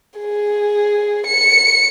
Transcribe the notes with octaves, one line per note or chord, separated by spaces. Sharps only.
G#4
C#7